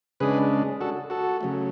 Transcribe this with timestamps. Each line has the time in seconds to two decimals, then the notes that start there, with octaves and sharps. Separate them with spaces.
0.20 C#3 G#3 D4 G#4 B4
0.81 F#4 A4
1.10 F#4 A4
1.41 C#3 F#3 A3